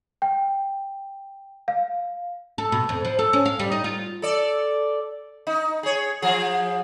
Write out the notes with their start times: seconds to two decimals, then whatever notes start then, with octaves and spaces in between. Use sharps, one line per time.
0.22 G5
1.68 F5
2.58 A4
2.72 B2
2.89 F2
3.05 F3
3.19 A4
3.33 C#4
3.46 F5
3.59 G3
3.72 D#4
3.84 F4
4.22 A4 D5
5.47 D#4
5.83 G#4 C#5
6.22 F3 G#4